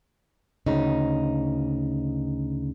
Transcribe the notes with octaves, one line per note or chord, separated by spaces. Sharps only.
D2 C#3 D#4